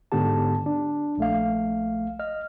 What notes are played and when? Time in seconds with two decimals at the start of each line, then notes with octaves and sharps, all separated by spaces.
0.12 G#2 D3 B3 G4 A5
0.66 D4
1.18 A#1 A3 F5
2.19 D#5 F6